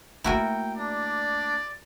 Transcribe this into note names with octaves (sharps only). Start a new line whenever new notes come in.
A3 A#3 E4 F#4 A#4 G5
D4 D5